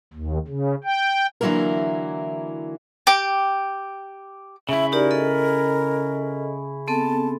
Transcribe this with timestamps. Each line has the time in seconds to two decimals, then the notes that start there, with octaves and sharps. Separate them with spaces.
0.14 D#2
0.48 C#3
0.84 G5
1.41 D3 E3 F#3 A#3 E4 A#4
3.07 G4 G5 D6
4.69 C#3 E4 E5
4.92 D#4 G4 A#4 D5
5.11 A4 D#5
6.88 B3 C4 A4 A5